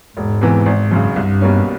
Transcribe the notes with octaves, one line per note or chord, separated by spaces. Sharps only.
E1 G#2
E2 C3 E3
G#1
F#2 C#3
C2 G2
B2 G3 A#3 C#4